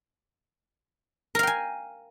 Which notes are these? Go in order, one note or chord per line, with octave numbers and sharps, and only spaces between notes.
A#4 F5 G5 G#5